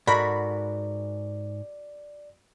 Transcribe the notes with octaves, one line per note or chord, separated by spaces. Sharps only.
G#2 F#4 A4 A#4 D5 B5